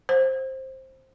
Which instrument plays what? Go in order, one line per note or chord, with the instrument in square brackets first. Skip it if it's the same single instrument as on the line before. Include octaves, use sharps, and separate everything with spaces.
[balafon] C5